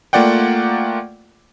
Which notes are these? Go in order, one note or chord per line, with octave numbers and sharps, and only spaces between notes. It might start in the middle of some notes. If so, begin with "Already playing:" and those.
A3 A#3 F4 D5 F#5 G5